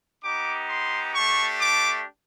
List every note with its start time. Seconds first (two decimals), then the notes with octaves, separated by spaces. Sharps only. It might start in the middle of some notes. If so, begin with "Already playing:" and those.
0.24 B3 D#4 G4 D6
0.69 C6
1.14 A3 D4 G4 C#6
1.60 D6